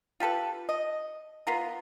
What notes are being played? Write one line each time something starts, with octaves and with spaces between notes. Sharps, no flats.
F4 G4 A4 B4
D#5
B3 F4 A#4